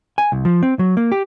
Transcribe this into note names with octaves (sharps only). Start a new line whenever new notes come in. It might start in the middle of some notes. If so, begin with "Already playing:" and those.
G#5
C2
F3
C4
F#3
A#3
G4